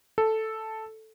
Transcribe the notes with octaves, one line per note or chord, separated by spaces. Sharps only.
A4